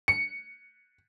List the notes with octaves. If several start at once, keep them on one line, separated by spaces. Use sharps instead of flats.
C#7